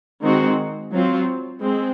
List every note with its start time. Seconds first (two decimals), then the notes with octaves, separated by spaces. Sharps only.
0.21 D#3 G#3 C4 F#4
0.92 F#3 C4 F4
1.62 G#3 C4